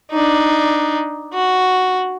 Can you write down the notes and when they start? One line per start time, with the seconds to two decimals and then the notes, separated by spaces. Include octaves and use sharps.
0.12 D4 D#4
1.33 F#4